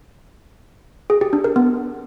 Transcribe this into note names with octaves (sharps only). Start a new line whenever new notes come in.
G#4
G4
D4
A#4
B3